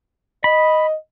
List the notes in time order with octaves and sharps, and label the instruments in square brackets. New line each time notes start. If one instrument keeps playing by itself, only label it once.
[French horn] D#5 [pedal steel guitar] B5